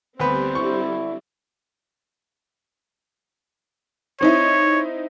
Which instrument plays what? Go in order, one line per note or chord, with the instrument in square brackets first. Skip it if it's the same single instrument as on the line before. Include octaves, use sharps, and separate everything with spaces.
[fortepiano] D2 B3 B4 [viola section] G3 C4 [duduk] C5
[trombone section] D3 D4 E4 [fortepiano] C#6
[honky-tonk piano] C4 D#4 E4 [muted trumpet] C#5